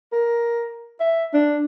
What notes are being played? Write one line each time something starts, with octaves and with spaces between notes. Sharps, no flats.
A#4
E5
D4